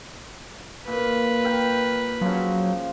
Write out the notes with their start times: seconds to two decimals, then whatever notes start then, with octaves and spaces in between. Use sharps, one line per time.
0.87 A#2 B4
1.44 A#4 G5
2.21 C#3 F3 F#3